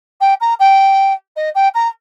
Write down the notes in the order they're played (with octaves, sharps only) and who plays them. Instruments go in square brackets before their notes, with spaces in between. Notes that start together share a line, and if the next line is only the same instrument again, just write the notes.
[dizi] G5
A#5
G5
D#5
G5
A#5